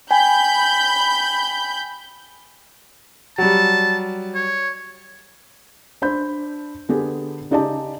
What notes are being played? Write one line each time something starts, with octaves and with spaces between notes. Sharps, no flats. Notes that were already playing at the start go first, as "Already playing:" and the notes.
G5 G#5 B5 G6
F#3 G3 A5
C#5
D4 C5 B5 G6
D3 B3 D4 G4 G#4
C#3 D#4 G4 D5 D#5 A5